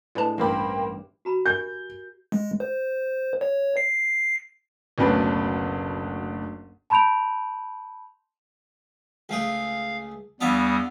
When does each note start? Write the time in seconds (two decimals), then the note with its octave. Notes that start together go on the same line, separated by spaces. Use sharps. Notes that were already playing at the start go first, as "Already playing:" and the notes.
0.15 A2 G#3 D4 E4 B4 A5
0.38 A1 G2 A#3 G4 C5 G5 B5
1.25 F#4 A#5 B5
1.46 G4 A#4 G#5 G6
2.32 G#3
2.60 C5
3.41 C#5
3.77 C7
4.98 F#1 D2 B2 C#4 D4 B4
6.90 A5 B5 C6 G6 D7 F7
9.29 C#2 A3 G#4 F5
10.41 E2 G3 B3 D4 F4 E5 D#6